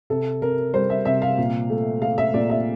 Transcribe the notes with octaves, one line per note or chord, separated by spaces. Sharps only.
C3 A4
C3 A#4
G3 C5
E5
C3 E5
F5
A#2
A3
A3 F5
E5
A#2 D5
E5